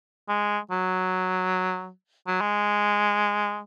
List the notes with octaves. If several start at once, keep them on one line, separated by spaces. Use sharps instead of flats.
G#3
F#3
F#3
G#3